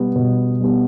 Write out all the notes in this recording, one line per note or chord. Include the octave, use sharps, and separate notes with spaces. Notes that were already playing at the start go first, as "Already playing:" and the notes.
Already playing: B2 G3 B3
B2
G3 B3